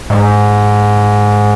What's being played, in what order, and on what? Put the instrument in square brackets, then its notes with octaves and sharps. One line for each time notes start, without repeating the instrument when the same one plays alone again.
[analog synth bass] G#2